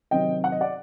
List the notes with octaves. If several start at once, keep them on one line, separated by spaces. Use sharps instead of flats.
C3 D#3 F#3 C4 D#5 G5
F#5
D#5
D5 F#5